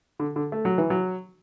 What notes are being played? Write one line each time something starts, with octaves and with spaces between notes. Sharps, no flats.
D3
D3
A3
F#3
E3
F#3